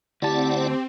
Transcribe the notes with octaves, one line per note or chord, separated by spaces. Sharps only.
D2 C4 E4 G4 D5 F#5 A5